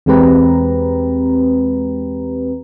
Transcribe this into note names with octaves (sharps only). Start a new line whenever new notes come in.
E2 G#3 C4 G4 B4 A#5